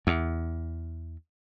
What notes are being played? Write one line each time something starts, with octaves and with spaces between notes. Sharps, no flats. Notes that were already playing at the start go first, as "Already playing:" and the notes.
E2